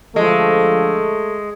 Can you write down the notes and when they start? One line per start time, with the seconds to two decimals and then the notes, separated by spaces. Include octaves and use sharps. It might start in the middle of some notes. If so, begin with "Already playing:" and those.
0.16 D3 F3 G#3 A3